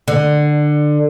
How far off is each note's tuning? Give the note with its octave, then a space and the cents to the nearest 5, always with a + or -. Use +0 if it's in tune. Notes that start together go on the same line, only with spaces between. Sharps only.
D3 +20